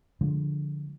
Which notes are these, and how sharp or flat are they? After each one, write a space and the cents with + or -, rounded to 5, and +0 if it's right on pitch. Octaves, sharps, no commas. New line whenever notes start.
D3 +0 F3 +0 G#3 +0